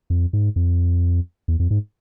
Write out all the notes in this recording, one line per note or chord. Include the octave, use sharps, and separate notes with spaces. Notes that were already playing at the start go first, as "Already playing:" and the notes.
F2
G#2
F2
E2
F2
G#2